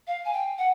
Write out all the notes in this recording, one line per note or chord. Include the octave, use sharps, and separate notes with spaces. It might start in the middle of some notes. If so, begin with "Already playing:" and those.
F5
G#5
G5
F#5